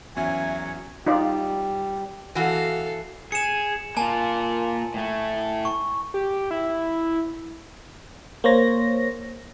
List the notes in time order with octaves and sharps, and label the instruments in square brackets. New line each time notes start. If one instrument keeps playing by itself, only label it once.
[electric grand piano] E2 C#4 [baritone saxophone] F#3 [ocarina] E5 [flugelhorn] G#5
[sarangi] G3 [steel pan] D#4 F4 D5
[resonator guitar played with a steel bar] E3 F#4 [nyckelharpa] A4 F5
[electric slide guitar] G#4 [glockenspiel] C#7 E7
[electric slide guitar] A#3 F4 [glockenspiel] G#5 A5
[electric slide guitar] A2 A3
[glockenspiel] C#6
[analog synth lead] G4
E4
[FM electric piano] A#3 C5 C#5 A#6